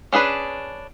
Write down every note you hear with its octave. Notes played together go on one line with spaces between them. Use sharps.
C#4 D4 G#4 B4